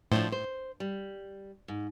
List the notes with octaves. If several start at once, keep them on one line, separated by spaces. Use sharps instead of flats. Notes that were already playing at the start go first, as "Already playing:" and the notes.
A2 F3 D4 C5
C5
G3
G#2